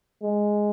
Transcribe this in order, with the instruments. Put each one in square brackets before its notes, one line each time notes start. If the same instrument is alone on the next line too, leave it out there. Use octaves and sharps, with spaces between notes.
[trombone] G#3